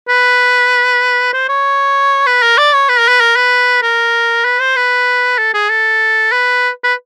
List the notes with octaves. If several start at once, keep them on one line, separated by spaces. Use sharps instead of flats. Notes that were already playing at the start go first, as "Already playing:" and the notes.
B4
C5
C#5
B4
A#4
D5
C#5
B4
A#4
B4
A#4
B4
A#4
B4
C5
B4
A4
G#4
A4
B4
B4